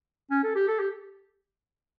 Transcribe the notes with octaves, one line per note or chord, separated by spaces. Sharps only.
C#4
A4
G4
A4
G4